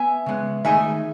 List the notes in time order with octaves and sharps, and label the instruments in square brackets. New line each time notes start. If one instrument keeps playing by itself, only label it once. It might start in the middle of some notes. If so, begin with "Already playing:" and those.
Already playing: [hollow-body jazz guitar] B3 [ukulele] E5 G#5
[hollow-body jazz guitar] C#3 G#3 B3
[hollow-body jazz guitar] D#3 A3 D#4 G#4 D#5 [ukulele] E5 G#5